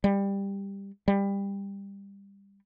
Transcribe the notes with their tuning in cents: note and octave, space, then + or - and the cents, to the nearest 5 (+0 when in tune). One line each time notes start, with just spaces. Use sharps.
G3 +15
G3 +20